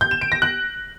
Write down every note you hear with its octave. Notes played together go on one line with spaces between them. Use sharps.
G6
E7
D7
A#6
F#6